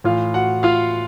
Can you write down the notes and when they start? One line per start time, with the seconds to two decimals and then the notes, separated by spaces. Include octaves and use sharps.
0.04 A2 E3 F4 F5
0.34 F#4 F#5
0.63 F4 F5